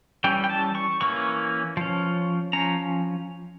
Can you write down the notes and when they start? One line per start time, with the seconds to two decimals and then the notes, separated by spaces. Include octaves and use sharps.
0.24 E3 G3 C#4 G5
0.44 G5
0.50 A5
0.75 C#6
1.01 E3 A#3 C#4 C#6
1.77 F3 C#4
2.53 F3 C#4 A#5